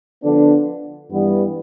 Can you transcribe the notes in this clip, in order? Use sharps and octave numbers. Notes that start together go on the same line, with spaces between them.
D3 F3 B3 D4
G2 E3 G3 B3